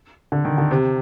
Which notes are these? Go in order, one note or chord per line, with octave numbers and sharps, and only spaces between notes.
D3
D#3
D3
C3